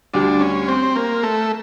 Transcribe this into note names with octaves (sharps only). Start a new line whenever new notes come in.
D2 D3 G3 D4
C#4
C4
A#3
A3